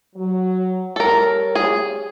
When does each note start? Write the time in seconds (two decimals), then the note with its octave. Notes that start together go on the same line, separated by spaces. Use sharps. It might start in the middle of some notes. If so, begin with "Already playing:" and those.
0.15 F#3
0.96 G3 A4 A#4 C#5
1.55 G#4